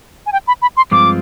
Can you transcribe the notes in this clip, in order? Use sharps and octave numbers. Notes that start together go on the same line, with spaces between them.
G#5
G5
B5
B5
C6
G2 F3 G#3 C4 F4 D6